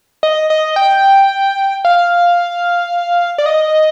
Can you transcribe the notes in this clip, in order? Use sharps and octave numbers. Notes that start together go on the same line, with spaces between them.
D#5
D#5
G5
F5
D5
D#5